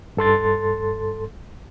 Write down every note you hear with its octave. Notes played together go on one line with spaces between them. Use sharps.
G2 A4 C6 A6